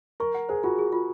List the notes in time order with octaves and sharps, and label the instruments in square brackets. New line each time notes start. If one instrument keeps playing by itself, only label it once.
[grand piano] A#4 [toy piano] C#6
[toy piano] F#5
[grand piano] G#4 [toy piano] C5
[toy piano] F4 [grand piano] F#4
[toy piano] G#4
F4